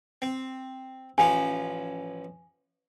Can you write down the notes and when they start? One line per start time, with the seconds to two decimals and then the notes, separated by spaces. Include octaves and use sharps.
0.22 C4
1.18 A1 F3 C#4 G#5